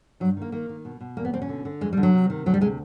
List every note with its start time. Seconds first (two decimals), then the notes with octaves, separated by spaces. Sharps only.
0.20 G2 F#3
0.37 D#3 A#3
0.52 D#3 A#3
0.69 D#3
0.85 B2
1.01 B2
1.17 E2 A#3
1.25 B3
1.33 B2 C4
1.42 C#4
1.49 D3
1.65 D3
1.81 F2 G#3
1.93 G3
1.97 D3
2.03 F#3
2.13 C3
2.30 D#3
2.46 D2 F#3
2.54 G3
2.61 C3 G#3